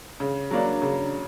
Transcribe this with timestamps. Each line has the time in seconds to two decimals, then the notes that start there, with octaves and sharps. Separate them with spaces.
0.20 C#3
0.51 F#3 A#3 D4
0.82 C#3